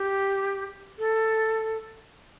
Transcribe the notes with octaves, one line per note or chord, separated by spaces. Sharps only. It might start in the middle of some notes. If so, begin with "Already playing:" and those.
Already playing: G4
A4